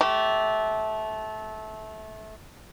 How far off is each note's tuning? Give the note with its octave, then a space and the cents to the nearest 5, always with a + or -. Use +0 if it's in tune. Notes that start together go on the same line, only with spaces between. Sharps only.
A3 -20 G4 -35